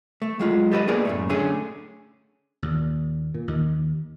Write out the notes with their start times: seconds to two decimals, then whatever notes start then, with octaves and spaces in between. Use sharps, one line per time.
0.22 A3
0.39 F#3 G#3 F4
0.72 G4 A4 B4 D5 D#5
0.88 A#3 B3 G#4 A#4 D5
1.05 F#2 A2 A3
1.29 D3 A3 C#4 G#4
2.62 D#2 A#2
3.34 A#2
3.48 D#2 D#3